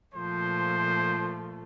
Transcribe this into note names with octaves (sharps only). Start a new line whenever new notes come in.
A#2 F3 A3 C5